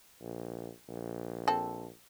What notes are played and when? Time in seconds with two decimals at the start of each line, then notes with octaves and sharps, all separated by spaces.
0.21 A#1
0.89 A#1
1.48 C4 A4